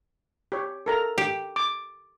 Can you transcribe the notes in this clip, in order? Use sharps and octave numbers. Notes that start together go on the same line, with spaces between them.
G4 C#5
A4 A#4 A#5
G4
D6